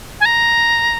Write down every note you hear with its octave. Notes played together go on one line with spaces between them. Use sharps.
G#5
A#5